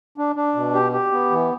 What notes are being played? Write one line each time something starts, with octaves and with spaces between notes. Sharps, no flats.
D4
D4
B2
G4
G4
B3
E3